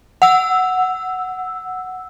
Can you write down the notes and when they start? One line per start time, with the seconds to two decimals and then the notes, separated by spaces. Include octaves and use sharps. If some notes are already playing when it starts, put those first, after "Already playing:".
0.22 F#5 E6